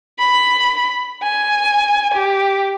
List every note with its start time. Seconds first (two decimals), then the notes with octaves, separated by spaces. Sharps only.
0.19 B5
1.23 G#5
2.14 G4